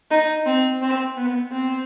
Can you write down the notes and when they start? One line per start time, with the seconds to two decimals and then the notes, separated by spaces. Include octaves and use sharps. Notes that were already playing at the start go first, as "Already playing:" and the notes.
0.11 D#4
0.46 C4
0.82 C4
1.17 B3
1.52 C4